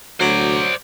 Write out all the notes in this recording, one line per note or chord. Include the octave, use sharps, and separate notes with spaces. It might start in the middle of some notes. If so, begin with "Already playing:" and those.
D2 F#3 C5 D5